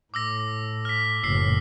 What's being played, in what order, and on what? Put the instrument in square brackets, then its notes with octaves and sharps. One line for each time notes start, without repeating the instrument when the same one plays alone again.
[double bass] A2 [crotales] D6 E6 A#6
[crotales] F6 B6
[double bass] F#1 A2 [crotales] E6 B6 C7